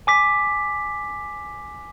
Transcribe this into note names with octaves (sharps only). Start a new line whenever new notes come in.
G#5 D6 B6